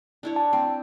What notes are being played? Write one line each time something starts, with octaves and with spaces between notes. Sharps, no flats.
D4 E4 C#5
A5
C4